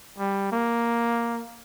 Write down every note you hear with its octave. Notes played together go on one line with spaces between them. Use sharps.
G3
A#3